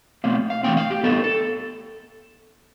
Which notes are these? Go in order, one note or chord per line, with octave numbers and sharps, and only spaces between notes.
B2 A3 C4 F5
F5
E3 A3 C4 G5
F5
G4
A2 G3 B3 A4
A4